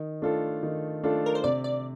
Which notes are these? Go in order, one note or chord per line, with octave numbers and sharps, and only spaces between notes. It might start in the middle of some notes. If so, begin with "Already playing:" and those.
Already playing: D#3
A3 D4 F4 A4
D#3
A3 D4 F4 A4
A#4
C5
C3 D5
D5